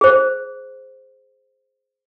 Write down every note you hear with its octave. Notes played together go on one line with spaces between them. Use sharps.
G#4 C5